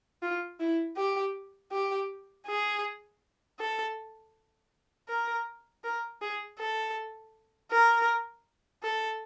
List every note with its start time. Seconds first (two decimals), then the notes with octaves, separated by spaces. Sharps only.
0.22 F4
0.60 E4
0.97 G4
1.72 G4
2.47 G#4
3.59 A4
5.09 A#4
5.84 A#4
6.22 G#4
6.59 A4
7.72 A#4
8.84 A4